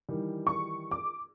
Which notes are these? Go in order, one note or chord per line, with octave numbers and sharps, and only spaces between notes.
D#3 E3 G3
C#6
D6